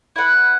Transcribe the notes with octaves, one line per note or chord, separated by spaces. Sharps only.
E4 B4 F#5